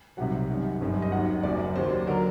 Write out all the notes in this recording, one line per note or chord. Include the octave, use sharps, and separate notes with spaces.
C2 C3 D#3 F#3 F#5
F#2 D#3 G3
G1 F#2 D#3 G3
D#5
D#2 D#3 F#3 F#5
F#1 F#2 F#3 D5
D#2 D#3 F#3 C5
D3 F#3 A#4